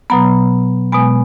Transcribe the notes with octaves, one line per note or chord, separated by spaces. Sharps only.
B2 F#3 B3 A#5
B2 G#3 B3 G#5